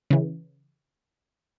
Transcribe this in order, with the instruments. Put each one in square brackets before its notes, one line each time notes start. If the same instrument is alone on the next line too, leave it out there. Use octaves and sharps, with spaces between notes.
[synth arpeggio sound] C#3 E3